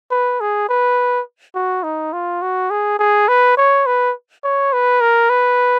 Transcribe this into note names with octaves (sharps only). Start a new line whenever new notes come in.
B4
G#4
B4
F#4
D#4
F4
F#4
G#4
G#4
B4
C#5
B4
C#5
B4
A#4
B4